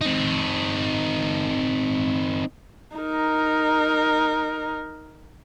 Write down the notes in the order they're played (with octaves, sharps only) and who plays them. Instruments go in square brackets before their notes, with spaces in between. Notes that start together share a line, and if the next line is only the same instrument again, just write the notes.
[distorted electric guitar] C4 D#4
[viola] D#4 A#4